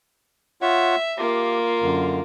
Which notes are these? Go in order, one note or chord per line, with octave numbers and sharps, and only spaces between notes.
F4 C#5 E5 F#5
A#3 F4 G4
F#2 D3